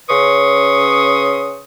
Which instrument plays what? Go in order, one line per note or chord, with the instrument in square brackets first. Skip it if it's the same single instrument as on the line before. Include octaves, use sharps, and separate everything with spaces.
[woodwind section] C#3 C#4 B4 C6 C#6 D#6